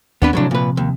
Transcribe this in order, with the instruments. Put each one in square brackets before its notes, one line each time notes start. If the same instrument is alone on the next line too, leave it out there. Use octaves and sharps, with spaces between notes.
[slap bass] D#2 C4 [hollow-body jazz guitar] B3 D4 B4
[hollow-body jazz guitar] A2 F#3 D4 [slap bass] C3 F3
[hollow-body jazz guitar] A#2 B4
D#2